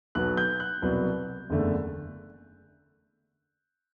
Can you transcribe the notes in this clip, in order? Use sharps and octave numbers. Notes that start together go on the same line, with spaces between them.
B1 B2 F#3 B3 F#6
G6
F#6
C2 B2 F#3 B3
F#1 E2 D3 A3